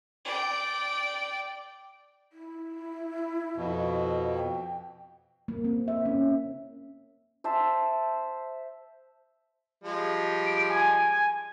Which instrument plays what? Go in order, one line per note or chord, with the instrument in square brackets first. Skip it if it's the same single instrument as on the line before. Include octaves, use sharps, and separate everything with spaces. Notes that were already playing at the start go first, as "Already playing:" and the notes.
[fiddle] D5 G5
[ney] E4
[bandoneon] F2 B2
[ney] G5
[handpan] A#3
C4
E5
C#4
[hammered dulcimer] C5 E5 A5
[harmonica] F3 G3 G#3
[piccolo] D7
G#5